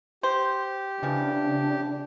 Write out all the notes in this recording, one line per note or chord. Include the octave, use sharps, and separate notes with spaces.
G4 C5
C#3 E3 F3 D4